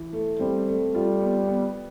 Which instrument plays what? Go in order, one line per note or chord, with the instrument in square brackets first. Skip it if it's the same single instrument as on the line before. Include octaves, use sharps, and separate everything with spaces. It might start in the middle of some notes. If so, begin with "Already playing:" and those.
Already playing: [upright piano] E3
A3
[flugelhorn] G3 [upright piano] C4
[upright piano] A3
[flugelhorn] G3 [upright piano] F4
[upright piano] B3
B3